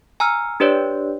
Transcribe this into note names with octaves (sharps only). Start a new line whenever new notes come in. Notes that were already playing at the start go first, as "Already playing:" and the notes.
G#5 A#5 E6 F6
D4 G4 B4 C#5 D5